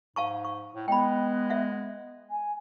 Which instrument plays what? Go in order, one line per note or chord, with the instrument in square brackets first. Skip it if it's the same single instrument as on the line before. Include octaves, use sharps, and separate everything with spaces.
[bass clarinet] G#2 [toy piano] F5 A5 C#6
[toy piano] C#6
[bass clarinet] A2
[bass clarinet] G#3 [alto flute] B3 [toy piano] G5 B5
[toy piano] E5 F#5
[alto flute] G#5